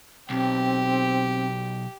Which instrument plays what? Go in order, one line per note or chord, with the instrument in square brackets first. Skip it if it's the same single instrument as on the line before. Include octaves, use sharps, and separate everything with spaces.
[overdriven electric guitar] B1 [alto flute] C4 [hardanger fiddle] G4